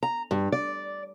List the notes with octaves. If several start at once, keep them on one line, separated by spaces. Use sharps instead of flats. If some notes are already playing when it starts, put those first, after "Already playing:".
A#5
G2
D5